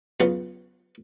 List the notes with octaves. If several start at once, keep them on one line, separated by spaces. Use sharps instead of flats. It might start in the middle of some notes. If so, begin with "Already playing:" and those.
E2 C#3 F#3 B3 F4